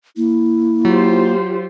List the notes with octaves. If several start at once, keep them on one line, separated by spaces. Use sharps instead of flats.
A#3 E4
F#3 F4 G4 C5